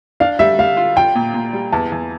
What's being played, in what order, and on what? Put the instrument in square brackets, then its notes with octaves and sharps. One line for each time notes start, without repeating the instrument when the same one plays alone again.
[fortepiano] D4 [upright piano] F5
[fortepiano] G3 [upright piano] E5
[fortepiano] G3 [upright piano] F5
[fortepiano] F4
[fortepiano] F4 [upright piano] G5
[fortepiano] A#2
A#2
G3
[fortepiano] E2 [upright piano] A5
[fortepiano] E2